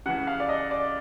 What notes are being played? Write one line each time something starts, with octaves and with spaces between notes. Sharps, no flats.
C#3 E3 F#5
F5
D5
D#5
D5